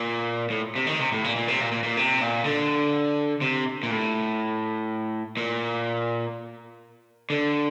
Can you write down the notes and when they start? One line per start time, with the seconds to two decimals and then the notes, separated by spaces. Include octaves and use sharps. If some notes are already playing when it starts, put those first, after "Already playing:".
Already playing: A#2
0.50 A2
0.76 C3
0.87 D#3
0.99 C3
1.12 A2
1.24 A#2
1.36 A#2
1.48 C3
1.61 A#2
1.72 A#2
1.84 A#2
1.97 C3
2.21 A#2
2.45 D3
3.41 C3
3.83 A#2
3.91 A2
5.37 A#2
7.30 D3